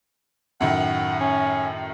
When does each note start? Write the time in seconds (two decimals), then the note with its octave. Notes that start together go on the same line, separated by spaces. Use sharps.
0.61 F#2 A2 D#3 F#5
1.20 C#4